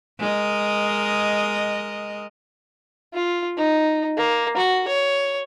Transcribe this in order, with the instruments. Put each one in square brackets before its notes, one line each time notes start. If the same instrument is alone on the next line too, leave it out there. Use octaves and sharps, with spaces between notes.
[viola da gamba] G#3 A#4 D#5
[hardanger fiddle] F4
D#4
A#3
F#4
C#5